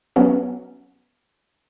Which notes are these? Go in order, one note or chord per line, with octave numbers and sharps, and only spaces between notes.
F#3 B3 C#4 F#4